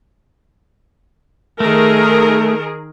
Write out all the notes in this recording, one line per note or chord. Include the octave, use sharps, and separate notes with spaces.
D#3 A3 G#4 A#4